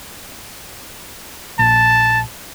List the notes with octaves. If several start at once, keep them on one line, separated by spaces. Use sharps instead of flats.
A#1 A5